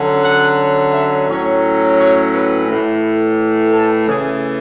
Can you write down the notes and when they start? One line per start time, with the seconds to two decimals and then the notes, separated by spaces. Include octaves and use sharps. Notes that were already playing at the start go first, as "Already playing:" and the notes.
Already playing: D3 F#3 C#4
0.23 F#5
0.93 E5
1.28 A2 F#3 C#4 C#5
1.98 C#5
2.33 B4
2.67 A2 E3 A3
3.72 A4
4.07 C#3 E3 A3 G#4